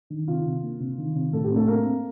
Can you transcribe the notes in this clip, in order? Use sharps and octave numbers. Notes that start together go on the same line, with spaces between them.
D#3
C3 F4
C3
A#3
C3
D#3
C3
A2 A4
G4
C4
A3 A4
A#3 C4 A#4
C4